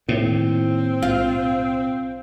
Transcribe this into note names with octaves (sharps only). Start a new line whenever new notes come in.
A2 D#3 A#3 C4 E4
B1 F4